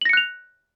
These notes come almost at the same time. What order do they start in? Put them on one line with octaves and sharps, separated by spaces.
F#7 A#6 C#7 F#6 F7